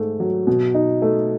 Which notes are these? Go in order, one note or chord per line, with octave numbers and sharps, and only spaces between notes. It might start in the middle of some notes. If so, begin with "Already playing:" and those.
Already playing: G#2 A3
F#3
B2
D#4
A3